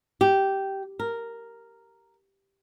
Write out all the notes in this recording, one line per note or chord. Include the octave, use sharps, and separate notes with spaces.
G4
A#4